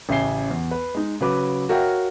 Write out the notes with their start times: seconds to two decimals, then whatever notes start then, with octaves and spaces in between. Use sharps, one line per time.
0.09 A1 C#3 E5 G#5 C7 G7
0.51 E2
0.71 B4
0.95 G#3 D#4
1.21 C#3 F#3 B4 D6
1.69 F#4 A#4 C#5 E5 F5 G5